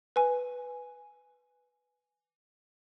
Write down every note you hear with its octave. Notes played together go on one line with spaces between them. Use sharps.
B4 G#5